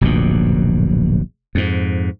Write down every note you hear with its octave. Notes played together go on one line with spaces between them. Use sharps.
D1 A#1 F#2 B2
F2 G#2